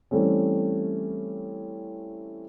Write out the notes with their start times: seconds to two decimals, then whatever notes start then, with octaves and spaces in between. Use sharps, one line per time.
0.11 E3 G3 A3 C4 C#4